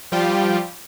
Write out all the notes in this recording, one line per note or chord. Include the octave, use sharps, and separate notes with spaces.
F3 G3 F4 G4